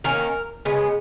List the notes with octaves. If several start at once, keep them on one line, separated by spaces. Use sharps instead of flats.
D#3 A#3 C#4 A#4
C#3 G#3 B3